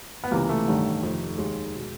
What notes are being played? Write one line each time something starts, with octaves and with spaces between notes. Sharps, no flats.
B3
C#2 C3 E3 A#3
A3
A1 G2 D#3
F1 F2 C3 D#3
D#2 D#3 G#3
B2